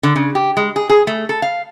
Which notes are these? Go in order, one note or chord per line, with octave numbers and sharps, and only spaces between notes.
D3
C#3
G4
G#3
G#4
G#4
A3
A4
F5